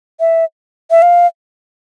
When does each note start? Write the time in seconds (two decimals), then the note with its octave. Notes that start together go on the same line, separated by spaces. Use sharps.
0.20 E5
0.91 E5
1.02 F5